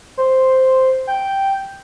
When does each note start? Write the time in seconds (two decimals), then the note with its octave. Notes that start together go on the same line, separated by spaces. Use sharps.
0.18 C5
1.07 G5